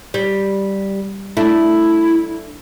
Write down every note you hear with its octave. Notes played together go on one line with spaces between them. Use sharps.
G3
A3 D4 E4